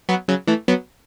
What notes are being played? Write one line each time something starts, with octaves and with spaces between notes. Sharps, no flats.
F#3 B3
C#3 F#3
E3 A3
F#3 B3